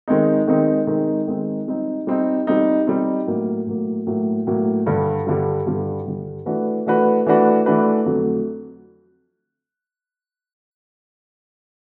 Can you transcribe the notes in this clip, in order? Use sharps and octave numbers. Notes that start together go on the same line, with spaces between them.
D#3 G#3 C4 D#4
D#3 G#3 C4 D#4
D#3 G#3 C4 D#4
D#3 G#3 C4 D#4
G3 C4 D#4
G3 C4 D#4
G3 C4 D#4
G3 C4 D#4
A2 F#3 A#3
A2 F#3 A#3
A2 F#3 A#3
A2 F#3 A#3
G2 D3 G3
G2 D3 G3
G2 D3 G3
G2 D3 G3
E3 A3 D4 F#4 B4
E3 A3 D4 F#4 B4
E3 A3 D4 F#4 B4
E3 A3 D4 F#4 B4
F2 D3 F#3 A3